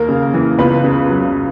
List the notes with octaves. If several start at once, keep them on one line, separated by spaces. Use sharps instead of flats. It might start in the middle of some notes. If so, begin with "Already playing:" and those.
Already playing: D#2 A#3 A#4
C#3
E3
C#2 B3 B4
C#3
F#3